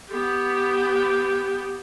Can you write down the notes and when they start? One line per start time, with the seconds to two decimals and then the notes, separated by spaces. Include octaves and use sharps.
0.10 B3 G4